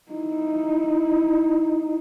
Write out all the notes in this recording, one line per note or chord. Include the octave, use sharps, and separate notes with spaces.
D#4 E4